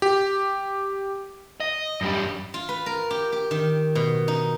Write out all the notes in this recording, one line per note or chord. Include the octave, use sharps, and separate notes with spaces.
G4
D#5
F#2 G3
F4
B4
A#4
G4
G4
D#3
B2
D#4